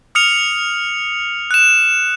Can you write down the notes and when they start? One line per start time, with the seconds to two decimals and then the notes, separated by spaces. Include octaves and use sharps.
0.15 D#6 F6 C#7 F7
1.51 F#6 E7